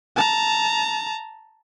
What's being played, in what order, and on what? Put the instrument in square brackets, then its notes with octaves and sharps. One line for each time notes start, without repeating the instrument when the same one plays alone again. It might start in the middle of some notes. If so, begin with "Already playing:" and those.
[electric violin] A5 A#5